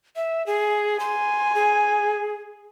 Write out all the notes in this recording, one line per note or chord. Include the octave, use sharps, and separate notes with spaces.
E5
G#4
G#5 C6
G#4